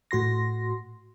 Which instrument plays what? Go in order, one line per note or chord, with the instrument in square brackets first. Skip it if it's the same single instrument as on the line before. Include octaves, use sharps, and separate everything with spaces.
[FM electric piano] A2 F#4 C6 A#6